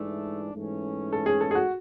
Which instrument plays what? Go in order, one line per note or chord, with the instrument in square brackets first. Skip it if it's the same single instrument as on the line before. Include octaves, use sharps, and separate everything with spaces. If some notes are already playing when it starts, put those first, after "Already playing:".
Already playing: [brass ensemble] G#2 E3 A3 D4
G#2 E3 A3 C#4
[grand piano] A4
G#4
A4
G#4
F#4